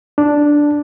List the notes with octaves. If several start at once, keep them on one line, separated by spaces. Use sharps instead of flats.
D4